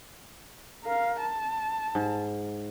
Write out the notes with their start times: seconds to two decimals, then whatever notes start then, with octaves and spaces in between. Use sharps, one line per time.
0.84 A#4 F5
1.20 A5
1.95 G#2